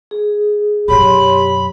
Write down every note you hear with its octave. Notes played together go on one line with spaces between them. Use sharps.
G#4
F#2 B2 G4 C#5 B5 C6